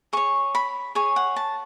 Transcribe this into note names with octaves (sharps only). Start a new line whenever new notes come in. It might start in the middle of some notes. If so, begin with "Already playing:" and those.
G#4 C#5 C#6
B5
G#4 C#5 G#5
F#5
A5